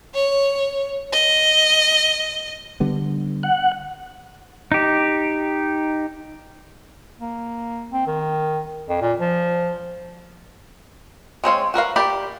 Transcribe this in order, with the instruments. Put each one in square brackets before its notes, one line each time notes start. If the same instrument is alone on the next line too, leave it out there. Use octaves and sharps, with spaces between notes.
[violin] C#5
D#5
[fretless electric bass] D3 G3 B3
[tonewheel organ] F#5
[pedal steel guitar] D#4 G4
[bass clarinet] A#3
C4
D#3
F2
A#2
F3
[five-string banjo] G#3 C4 C#5 F5
F#4 A#4 B4 F5
G4 A#4 D5 B5